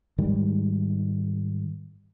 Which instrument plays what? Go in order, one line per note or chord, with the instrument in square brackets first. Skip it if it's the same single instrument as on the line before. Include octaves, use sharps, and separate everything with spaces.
[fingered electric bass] G#2 D#3 G3 G#3